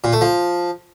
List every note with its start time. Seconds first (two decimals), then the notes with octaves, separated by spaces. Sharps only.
0.04 A#2
0.13 A3
0.21 F3